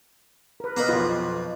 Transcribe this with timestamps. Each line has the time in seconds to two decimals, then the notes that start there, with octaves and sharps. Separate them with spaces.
0.60 A#4 B4
0.77 A#3 B3 B4 D#5 A#5 B5
0.88 B1 F2 F4 F#4 B4